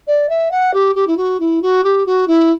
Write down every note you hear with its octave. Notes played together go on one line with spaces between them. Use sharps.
D5
E5
F#5
G4
G4
E4
F#4
E4
F#4
G4
F#4
E4